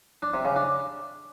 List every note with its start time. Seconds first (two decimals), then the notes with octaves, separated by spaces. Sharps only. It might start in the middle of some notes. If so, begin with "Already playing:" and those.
0.22 D4
0.34 C3
0.45 C#3
0.56 D4